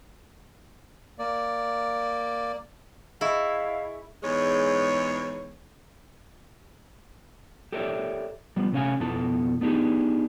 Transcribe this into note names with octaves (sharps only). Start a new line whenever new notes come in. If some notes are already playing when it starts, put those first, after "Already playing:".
A#3 D5
E4 G#4 D#5 F5 C#6
E2 G#2 G#3 C#5
G4 A4 A#4 C#5 D5 E5
F3 G3 B3
C3 A3 C#4 F5 F#5 G#5
F2 B2 B3 E4 A4 A5
B3 D4 D#4 G4 G#4